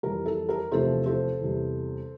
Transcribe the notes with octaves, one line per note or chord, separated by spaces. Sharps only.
F2 E3 G3 A#4
A4
A#4
E2 C3 F3 A3 A4 C5
A4 C5
E2 C3 G3